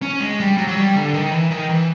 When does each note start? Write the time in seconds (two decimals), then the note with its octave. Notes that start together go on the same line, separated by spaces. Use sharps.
0.02 C#4
0.21 G#3
0.40 G3
0.58 F#3
0.68 F#3
0.77 G3
0.95 D3
1.14 D#3
1.32 E3
1.51 D#3
1.69 E3